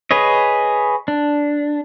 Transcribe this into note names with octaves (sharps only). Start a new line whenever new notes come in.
G#4 B4 C#5 D#5
D4